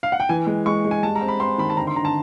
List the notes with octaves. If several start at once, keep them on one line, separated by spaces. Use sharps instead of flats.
F5
F#5
G5
E3 G#5
G#3
G#3 C#6
G#3
G#5
G3 A5
A#5
C4
B5
C4 C6
D#3 B5
A5
D3 A#5
C6
D3 A#5
A5